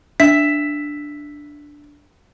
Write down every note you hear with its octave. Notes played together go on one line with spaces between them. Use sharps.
D4 E5 B6